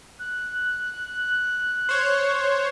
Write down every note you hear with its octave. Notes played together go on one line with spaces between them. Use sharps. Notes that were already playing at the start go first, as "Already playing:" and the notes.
F#6
C5 C#5